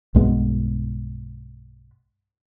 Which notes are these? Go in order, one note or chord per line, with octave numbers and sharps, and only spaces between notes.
B1 G2 G#3 B3